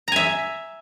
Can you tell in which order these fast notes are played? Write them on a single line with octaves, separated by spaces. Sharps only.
A#5 G#5 E5